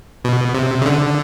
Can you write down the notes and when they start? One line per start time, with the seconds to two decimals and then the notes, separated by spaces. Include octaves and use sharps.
0.24 B2
0.55 C3
0.82 C#3
0.86 D3